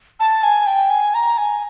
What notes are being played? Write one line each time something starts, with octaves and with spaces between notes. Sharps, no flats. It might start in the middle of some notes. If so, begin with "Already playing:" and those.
A5
G#5
G5
G#5
A#5
G#5